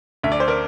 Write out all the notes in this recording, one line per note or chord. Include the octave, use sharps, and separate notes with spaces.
D2 E5
D5
C5
A#4 D5